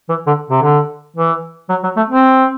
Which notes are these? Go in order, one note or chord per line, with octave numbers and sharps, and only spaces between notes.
E3
D3
C3
D3
E3
F#3
F#3
A3
C4